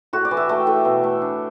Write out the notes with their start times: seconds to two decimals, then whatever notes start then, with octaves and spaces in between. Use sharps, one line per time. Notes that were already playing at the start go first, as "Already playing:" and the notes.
0.13 A2 F#4
0.25 D5
0.31 E3
0.37 E5
0.49 A3 G5
0.67 A2
0.85 B2
1.04 A3
1.22 D4